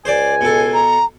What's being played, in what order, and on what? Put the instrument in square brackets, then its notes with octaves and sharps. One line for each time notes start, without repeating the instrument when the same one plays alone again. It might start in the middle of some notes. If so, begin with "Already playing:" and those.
[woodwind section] C#2 G#5 [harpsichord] C5 D5
[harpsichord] B2 A4
[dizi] A#5